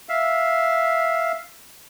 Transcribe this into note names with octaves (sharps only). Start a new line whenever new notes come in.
E5 F5